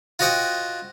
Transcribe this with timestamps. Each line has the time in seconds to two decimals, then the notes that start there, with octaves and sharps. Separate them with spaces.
0.19 F4 F#4 C5 D#5 F#5 G5